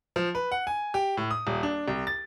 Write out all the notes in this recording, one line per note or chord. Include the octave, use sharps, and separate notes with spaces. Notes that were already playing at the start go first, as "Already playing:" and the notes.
F3
B4
F#5
G#5
G4
A2
D#6
D#1
D4
C2
A6